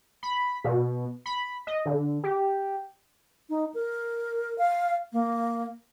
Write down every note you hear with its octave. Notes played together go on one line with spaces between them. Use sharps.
B5
B2
B5
D#5
D3
G4
D#4
A#4
F5
A#3